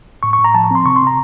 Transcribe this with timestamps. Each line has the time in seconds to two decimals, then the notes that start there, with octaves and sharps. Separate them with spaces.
0.23 A2 C#6
0.33 C#6
0.39 A2
0.44 A#5
0.54 F3 A5
0.64 A#5
0.71 C4 C6
0.85 C3 C#6
0.96 C6
1.02 C3 A#5